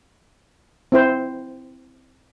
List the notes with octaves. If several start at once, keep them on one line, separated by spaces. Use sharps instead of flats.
C4 E4 C5